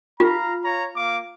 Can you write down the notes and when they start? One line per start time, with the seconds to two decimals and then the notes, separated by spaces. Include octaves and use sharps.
0.20 F4 F5 A#5
0.64 C#5 F5 A#5
0.97 A#3 F5 D6